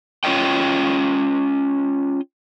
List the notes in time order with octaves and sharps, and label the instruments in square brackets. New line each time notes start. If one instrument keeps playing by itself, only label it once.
[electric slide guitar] C#4 F4 C#5 D#5 G5